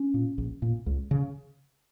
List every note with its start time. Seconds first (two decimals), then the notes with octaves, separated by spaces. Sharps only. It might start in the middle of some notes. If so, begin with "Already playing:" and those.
Already playing: C#4
0.14 A#2
0.38 A#1
0.62 A#2
0.86 C#2
1.11 C#3